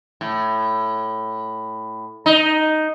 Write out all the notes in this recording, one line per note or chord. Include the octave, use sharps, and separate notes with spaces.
A2
D#4